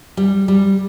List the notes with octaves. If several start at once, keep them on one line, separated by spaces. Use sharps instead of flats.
G3
G3